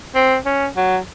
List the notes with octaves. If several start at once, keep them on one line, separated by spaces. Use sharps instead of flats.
C4
C#4
F#3